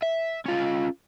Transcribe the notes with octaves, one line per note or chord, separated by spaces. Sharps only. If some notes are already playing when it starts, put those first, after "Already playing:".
E5
C#4 F4